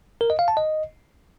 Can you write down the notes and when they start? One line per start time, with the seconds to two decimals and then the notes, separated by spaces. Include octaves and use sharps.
0.21 A#4
0.30 D#5
0.39 F5
0.48 A5
0.57 D#5